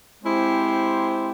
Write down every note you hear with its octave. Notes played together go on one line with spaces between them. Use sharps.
G#3 C4 E4 G4 C5